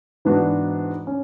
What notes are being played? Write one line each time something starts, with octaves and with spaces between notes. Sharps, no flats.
G#2 E3 B3 D4 F#4
C#4